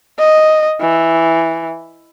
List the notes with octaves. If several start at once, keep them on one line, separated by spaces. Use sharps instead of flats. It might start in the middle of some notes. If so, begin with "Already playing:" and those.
D#5
E3